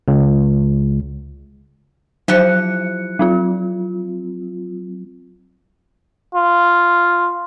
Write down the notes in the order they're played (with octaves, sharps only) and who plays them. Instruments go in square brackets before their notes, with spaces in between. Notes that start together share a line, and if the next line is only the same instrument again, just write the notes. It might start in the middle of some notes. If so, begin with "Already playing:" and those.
[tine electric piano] C#2
[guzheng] F3 E4 G4 [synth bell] F#3 F#6 C#7
[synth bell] F#3 C4 F4
[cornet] F4